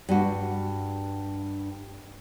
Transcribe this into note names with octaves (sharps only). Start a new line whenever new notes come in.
G2 F#4